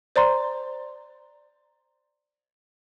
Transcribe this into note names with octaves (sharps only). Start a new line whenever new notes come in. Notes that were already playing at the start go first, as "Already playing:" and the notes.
C5 D5 A#5 C6